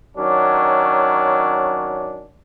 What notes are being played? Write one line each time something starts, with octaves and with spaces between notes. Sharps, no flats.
D#3 F#3 C#4 D4